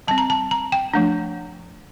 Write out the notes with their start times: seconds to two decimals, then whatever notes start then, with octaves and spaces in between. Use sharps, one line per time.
0.08 G3 C4 A5
0.18 A#5
0.30 A5
0.51 A#5
0.72 G5
0.94 F3 A3 D4